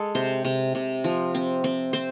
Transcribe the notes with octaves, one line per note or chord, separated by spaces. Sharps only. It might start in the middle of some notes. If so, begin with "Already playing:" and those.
Already playing: G#3 A4
C3 C5
C3
C3
F3
C4
C4
C4 C5